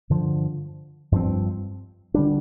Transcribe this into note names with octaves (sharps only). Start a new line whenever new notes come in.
G2 D3 F3
G2 F3 C4
D3 G3 D4